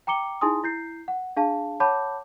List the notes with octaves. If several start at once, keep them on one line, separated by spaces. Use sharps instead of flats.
G5 A#5 D6 C#7 G7
D#4 E4 G#4 G#5 C6 D#6
E4 G6 C7
F#5
D4 G#4 F5 A5
C#5 F#5 A5 B5 D6 G6